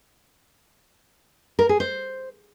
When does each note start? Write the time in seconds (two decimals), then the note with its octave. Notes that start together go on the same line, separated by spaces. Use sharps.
1.59 A#4
1.69 G#4
1.80 C5